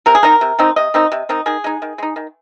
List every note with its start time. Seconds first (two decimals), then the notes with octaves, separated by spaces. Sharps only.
0.06 C3 A#4
0.15 G#4
0.23 D#3 C4 D#4 A#4
0.41 C3
0.59 D#3 C4 D#4
0.76 C3 D#5
0.94 D#3 C4 D#4
1.12 C3
1.29 D#3 C4 D#4
1.46 D#3 G#4
1.64 G#3 D#4
1.82 D#3
1.98 G#3 D#4
2.16 D#3